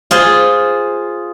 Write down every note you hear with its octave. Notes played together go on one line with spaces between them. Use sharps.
F4 G#4 C5